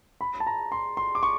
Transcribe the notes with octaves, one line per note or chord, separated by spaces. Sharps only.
B5
A5
A#5
C6
C6
D6
C#6